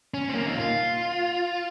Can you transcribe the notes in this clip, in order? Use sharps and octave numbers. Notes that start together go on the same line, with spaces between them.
C#4
C4
A#3
D#4
F4